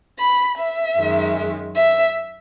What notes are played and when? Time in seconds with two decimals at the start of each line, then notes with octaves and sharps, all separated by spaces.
0.18 B5
0.57 E5
0.95 F#2 D#3 G#3
1.74 E5